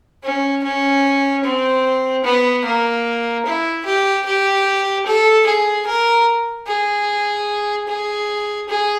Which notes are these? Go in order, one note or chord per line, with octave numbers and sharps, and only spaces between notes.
C#4
C#4
C4
B3
A#3
E4
G4
G4
A4
G#4
A#4
G#4
G#4
G#4